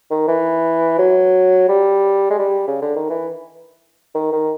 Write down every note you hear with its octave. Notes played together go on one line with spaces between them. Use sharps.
D#3
E3
F#3
G3
G#3
G3
C#3
D3
D#3
E3
D#3
D#3